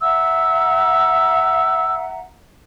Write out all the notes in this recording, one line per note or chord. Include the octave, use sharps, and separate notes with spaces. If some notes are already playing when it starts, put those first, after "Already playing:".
E5 F#5 A#5 E6